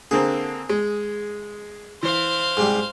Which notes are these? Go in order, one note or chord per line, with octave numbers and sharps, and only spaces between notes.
D3 A#3 C4 G#4
G#3
E3 C5 F5
G#2 C3 G3